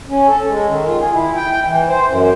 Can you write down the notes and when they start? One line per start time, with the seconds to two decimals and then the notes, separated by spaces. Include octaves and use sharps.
0.08 C#4
0.27 A4
0.48 G#3
0.68 D#3
0.86 F4
0.99 G#4
1.13 E4
1.36 G5
1.51 G5
1.65 E3
1.89 C5
2.07 F#2